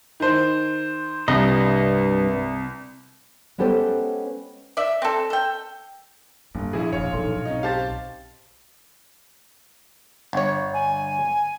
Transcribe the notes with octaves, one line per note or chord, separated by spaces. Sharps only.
D#3 C5
C2 G2 D#5
G#3 B3 C#4 G4 A4 C5
D5 E5
C4 A4
A4 G5
G1 G#2 A#3
A#1 E4 G#4
E1 C#5 F5
B1 G#2 D#4 A4 C6
C4 C#4 D#4 D#5
G4 C5 F5 A5 A6
G1 C#5
G#5